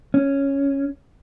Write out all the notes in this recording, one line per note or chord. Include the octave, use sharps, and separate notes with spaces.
C#4